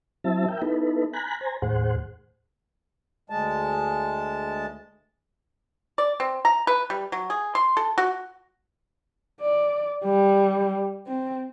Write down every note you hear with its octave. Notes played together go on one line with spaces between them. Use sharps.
F#3 C4 E4 E5 A5
A#4 E5 G5
B3 D#4 E4 A4 B4
G#5 A#5 B5 F#6
C5 G#5 A#5
D#2 A2 G#4 C5 F#5
D2 G#3 A5
D5
C4
A#5
B4
G3
F#3
G#4
C6
A4
F#4
D5
G3
C4